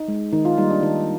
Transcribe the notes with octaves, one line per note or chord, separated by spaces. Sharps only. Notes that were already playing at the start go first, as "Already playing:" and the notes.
Already playing: D#4
G#3
D#3 D#4
F4
G3 A#3 D#4
D4
D#3 D#4